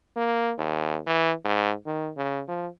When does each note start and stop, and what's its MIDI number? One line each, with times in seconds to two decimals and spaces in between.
0.16 0.53 58
0.58 0.99 39
1.07 1.32 52
1.45 1.73 44
1.86 2.11 51
2.17 2.42 49
2.48 2.67 53